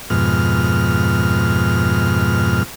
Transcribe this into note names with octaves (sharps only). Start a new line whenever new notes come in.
F2 G#2 B2 F6